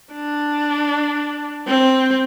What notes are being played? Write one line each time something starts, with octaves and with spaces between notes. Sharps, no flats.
D4
C4